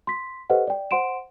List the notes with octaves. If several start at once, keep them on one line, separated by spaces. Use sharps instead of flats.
C6 B6
G4 A4 B4 C5 D#5 F#5
D5 G5
C5 F#5 C6 D7 E7